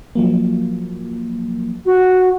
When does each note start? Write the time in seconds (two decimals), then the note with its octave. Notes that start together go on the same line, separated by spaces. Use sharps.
0.15 F3 F#3 A#3
1.85 F#4